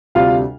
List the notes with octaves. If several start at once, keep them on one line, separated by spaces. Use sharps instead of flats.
D2 C3 G3 D4 F4 F5